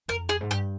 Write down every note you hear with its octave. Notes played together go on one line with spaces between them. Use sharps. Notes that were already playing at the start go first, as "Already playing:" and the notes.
F2 A#4
G#4
G#2
G2 G4